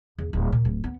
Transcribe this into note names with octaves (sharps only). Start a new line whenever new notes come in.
E2
D1
A#2
D1
B3